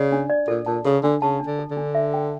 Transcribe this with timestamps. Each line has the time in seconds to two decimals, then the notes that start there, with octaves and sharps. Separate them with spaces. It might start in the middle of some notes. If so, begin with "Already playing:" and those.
Already playing: C#3 D5
0.12 D4
0.30 D5
0.48 A#2 A4
0.66 A#2 A5
0.85 C#3 A4
1.03 D3 D4
1.22 C#3 A5
1.40 D4
1.46 D3
1.59 A4
1.71 D3
1.77 D4
1.95 E5
2.14 G5